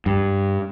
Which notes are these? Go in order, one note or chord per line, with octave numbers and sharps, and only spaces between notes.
G2